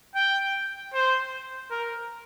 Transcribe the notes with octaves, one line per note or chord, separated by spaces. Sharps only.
G5
C5
A#4